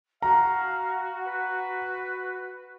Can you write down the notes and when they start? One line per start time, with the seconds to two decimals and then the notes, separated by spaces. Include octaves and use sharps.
0.22 F#4 F5 A#5
1.27 B4